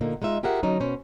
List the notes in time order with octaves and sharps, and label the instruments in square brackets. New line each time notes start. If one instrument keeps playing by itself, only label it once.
[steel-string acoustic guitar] A#2 D3 A#3 D#4
G#3 D#4 F4 E5
F4 G4 G#4 A#4 E5 F#5
D3 F#3 C#4 D#4
B2 C#4 C5